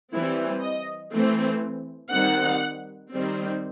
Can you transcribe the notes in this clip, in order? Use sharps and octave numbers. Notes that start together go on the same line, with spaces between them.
E3 G3 C4 E4
D#5
E3 A3 C4
D#3 G3 C4 F#5
D#3 G3 C4